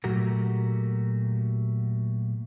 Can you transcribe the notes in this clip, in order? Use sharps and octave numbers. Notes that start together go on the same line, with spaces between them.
A#2 F#3 A3 F#4 G4 A#4